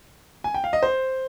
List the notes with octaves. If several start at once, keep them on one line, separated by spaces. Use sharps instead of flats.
G#5
G5
F5
D#5
C5